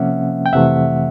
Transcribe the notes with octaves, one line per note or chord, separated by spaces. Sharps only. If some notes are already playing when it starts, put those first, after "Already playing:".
Already playing: C3 F3 A#3 C#4 E5 F#5
G5
F2 C3 E3 A3 E5 F#5